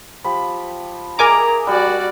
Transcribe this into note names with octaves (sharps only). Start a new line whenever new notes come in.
F3 G4 B5
G#4 A#4 D#5 E5 G#5 A#5 D6
G3 F#4 D5